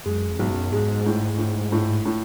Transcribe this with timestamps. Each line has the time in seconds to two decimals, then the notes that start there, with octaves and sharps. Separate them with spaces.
0.06 F#2 G#3
0.28 F2
0.39 B1 G#2
0.50 F#2
0.72 G#2 G#3
1.06 A2
1.38 A2
1.72 A2
2.05 A2